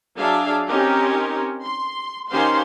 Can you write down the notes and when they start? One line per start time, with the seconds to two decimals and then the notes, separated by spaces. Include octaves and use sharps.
0.16 F#3 D4 G#4 E5 F5
0.68 C4 C#4 D#4 G4 A#4
1.63 C6
2.30 D#3 C#4 G4 C5 F5 C6